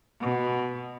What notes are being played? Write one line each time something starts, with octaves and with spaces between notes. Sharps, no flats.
B2